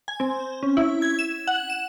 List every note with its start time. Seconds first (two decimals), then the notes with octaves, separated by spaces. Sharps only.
0.08 G#5
0.20 C4
0.63 C#4
0.77 E4
1.02 G#6
1.19 E7
1.47 F#5
1.70 E7